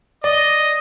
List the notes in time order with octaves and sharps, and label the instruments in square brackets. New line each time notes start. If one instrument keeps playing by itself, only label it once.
[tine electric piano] D5 [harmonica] D#5